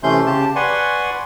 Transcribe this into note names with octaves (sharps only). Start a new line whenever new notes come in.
C3 E3 A3 C#4 C6 G6
C#3 G4 A5
B4 D5 F#5 G#5 C6 C#6